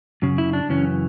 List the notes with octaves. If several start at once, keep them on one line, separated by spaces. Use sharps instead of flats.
F#2 C#3
E4
D4
F#2 C#3 E3 C#4